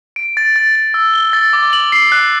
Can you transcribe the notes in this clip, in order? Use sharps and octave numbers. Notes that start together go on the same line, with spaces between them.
D7
A6
A6
A6
E6
G7
A6
D6
F#7
C7
F#6